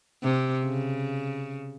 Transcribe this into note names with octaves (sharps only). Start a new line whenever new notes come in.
C3
C#3